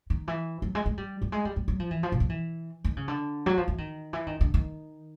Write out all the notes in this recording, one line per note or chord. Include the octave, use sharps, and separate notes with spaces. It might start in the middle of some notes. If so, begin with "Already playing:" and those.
D#3
E3
F#3
G#3
G#3
G3
G3
G#3
G3
G3
F#3
F3
E3
F3
B2
F3
E3
D#3
C#3
D3
F#3
F3
E3
D#3
E3
D#3
D3
D#3